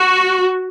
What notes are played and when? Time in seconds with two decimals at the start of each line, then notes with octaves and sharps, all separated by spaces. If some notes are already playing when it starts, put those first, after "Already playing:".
Already playing: F#4